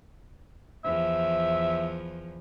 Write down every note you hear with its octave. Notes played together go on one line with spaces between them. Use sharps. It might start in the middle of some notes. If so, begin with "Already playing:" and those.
E2 F3 E5